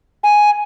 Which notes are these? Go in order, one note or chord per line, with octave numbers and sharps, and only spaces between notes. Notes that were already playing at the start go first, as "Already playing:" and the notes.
G#5